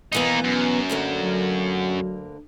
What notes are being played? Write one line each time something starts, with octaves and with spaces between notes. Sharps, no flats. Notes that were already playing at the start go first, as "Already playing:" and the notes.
B2 E3 A#3 B3 D#4
F#2
D2 D3 A#3
F#3